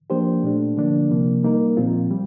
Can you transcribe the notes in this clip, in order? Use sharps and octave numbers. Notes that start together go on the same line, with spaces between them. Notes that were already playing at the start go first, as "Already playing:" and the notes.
F3 A#3 D4 G4 C5
A#2 A3 D4
D3 F3 A#3 D4
C3 F3 A#3
G3 A#3 D#4 A#4
A#2 F3 C4 F4
G3